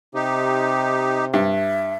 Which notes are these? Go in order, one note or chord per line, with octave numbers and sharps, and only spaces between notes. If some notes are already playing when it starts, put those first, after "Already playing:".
C3 D#4 G4
G2 E5